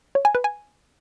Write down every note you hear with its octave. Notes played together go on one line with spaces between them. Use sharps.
C#5
G#5
B4
G#5